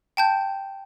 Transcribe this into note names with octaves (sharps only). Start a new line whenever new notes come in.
G5 A5 G6